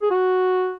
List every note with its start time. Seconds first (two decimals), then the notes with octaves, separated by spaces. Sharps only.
0.02 G#4
0.10 F#4